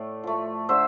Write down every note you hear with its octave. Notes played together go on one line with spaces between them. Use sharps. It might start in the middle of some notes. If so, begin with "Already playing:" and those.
Already playing: A2 A3 D5
F3 A3
D3 C5 E5